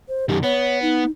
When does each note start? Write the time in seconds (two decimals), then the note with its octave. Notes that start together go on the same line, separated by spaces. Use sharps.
0.08 C5
0.29 F#2 D#3 G4
0.43 B3 C#5
0.82 D#4